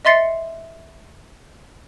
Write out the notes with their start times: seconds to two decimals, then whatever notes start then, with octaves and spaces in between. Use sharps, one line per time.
0.05 D#5 E5 C6 A6 C7 C#7